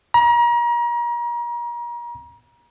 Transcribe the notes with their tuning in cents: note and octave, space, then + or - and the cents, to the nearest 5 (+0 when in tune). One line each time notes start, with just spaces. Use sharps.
A#5 +35